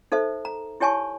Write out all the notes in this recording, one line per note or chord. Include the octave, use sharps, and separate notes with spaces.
D#4 A4 C5 E5
A#5
E4 G4 C#5 G#5 A5 C#6